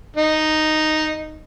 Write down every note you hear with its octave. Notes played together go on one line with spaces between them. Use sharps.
D#4